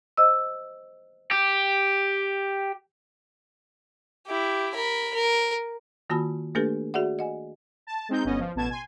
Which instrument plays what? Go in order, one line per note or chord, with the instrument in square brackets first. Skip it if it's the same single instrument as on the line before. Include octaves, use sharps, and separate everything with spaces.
[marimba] C5 D#5 E6
[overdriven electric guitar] G4
[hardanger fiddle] E4 G4
A#4 B5
A#4
[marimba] D#3 A#3 F4 F#4 A5 B5
A3 A#3 D4 G4 A4 B4
F#4 G#4 D5 E5 F#5
D#5 F#5 G#5
[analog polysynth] A5
G#3 C4 D#4 G6
G1 B3 C#4 D#5
F3
A1 B2 A5 G#6 E7
G#5 C6